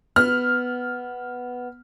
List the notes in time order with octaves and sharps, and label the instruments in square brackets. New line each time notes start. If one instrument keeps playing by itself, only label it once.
[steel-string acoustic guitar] B3 [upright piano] F6